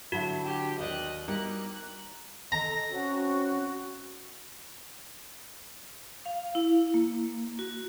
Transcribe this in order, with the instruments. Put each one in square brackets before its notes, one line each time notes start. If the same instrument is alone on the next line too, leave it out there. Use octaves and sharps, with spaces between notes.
[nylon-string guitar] D3 F#3 E4 [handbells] F#4
[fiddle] G4
[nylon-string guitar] D#2 D5 [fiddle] D#5 F#6
[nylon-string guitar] G3 A#3 D#4 [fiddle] F#6
[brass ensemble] A4 D#5 [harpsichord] A#5
[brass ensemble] C4 C#4 [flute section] F#4
[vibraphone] F5
E4
A#3
F#4